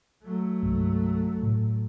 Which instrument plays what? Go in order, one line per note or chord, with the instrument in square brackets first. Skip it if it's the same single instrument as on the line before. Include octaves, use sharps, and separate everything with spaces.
[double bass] F#3 A3
[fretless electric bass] C2 G2 G#3
A2